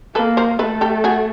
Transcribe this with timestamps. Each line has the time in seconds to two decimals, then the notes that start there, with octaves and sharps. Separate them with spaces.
0.15 A#3 A4 B4
0.37 A#4 C5
0.59 A3 A4 B4
0.81 G4 A4
1.04 F#4 G#4